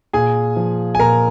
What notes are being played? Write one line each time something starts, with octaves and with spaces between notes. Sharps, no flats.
A#2 G#4 G#5
F3
G#5
A#2 A#4 A#5